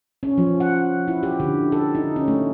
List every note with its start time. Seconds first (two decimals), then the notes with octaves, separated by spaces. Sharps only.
0.23 C#4
0.38 F3
0.60 F#5
1.08 E4
1.23 G4
1.40 D3
1.72 A4
1.95 D#4
2.16 C#4
2.28 A3